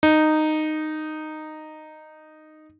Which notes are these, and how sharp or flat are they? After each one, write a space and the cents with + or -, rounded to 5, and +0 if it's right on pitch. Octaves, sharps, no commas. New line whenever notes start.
D#4 -10